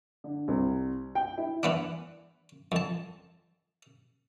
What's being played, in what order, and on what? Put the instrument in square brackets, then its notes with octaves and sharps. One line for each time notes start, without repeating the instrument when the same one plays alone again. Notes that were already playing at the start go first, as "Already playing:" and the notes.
[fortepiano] D3
C2
G5
E4
[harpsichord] E3 B3 D4
F2 A5